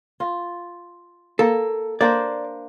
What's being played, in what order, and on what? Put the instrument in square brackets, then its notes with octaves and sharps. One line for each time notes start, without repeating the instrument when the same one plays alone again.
[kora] F4
[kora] A#3 [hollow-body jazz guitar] A4
[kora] A#3 D4 C5 [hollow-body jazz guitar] D5